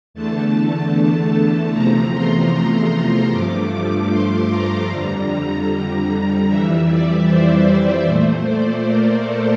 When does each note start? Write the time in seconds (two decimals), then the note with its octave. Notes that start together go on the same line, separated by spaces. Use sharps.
0.14 E2 D3 A3 A5
1.73 E2 C3 F3 A3 A#5
2.13 C6
2.53 C6
3.31 G2 F3 A3 D6
4.11 C6
4.50 A#5
4.90 F2 D3 G3
6.49 F2 E3 G3 E5
6.88 D5
7.27 C5
8.06 A#2 A3 C5
8.46 D5
8.86 A#4
9.26 A4